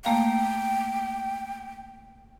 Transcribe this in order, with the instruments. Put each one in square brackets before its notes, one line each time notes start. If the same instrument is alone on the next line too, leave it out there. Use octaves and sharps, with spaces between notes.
[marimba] A3 A#3 F5 [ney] G5